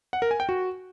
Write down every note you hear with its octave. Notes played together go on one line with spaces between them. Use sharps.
F#5
A#4
G#5
G5
F#4